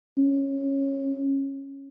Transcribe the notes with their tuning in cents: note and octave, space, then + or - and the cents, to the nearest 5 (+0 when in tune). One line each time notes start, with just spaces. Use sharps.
C#4 -15